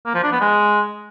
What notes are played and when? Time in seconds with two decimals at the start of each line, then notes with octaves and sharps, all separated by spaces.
0.06 A#3
0.15 F3
0.23 D4
0.32 B3
0.41 G#3